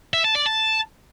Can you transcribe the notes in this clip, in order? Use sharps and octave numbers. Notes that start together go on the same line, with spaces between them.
E5
A5
D5
A5